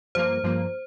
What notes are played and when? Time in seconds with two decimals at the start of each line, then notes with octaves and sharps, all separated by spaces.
0.15 G2 F3 A#3 C5
0.44 G2 F3 A#3